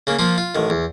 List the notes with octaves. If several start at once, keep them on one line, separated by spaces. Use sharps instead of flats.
C#3 A#3
F3 A#3 F4
F4
A1 D#3
E2